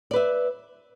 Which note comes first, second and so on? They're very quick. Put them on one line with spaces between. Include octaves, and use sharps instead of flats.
D5 B4 E5